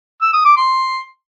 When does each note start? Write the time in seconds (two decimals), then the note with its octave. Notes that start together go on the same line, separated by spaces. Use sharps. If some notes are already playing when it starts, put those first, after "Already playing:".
0.22 E6
0.33 D#6
0.45 D6
0.57 C6